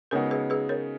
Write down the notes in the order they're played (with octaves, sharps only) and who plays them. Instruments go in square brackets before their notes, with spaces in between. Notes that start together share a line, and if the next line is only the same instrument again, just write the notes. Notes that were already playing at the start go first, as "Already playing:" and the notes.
[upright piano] C#3 G#3 B3 D#4 F#4 [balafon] A#4 C#5
[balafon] G#4 B4
G#4 B4
A#4 C#5